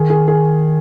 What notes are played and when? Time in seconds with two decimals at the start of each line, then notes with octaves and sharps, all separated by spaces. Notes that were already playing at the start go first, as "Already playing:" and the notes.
Already playing: D#3 G#4
0.10 G#4
0.28 G#4